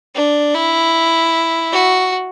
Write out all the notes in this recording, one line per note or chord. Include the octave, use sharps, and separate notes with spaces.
D4
E4
F#4